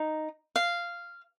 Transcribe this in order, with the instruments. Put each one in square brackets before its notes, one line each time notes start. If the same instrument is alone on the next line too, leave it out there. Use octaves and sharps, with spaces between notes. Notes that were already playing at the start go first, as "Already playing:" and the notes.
Already playing: [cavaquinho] D#4
F5